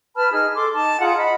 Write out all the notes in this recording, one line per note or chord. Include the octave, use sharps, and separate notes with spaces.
B4 A5 B5 F6
D#4 G#4 F6
A4 C6 D6
D#4 A5
F4 G#4 F#5 A#5
D#5 F#5 B5